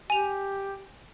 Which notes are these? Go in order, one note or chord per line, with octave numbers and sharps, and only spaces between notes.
G4 G#5 F7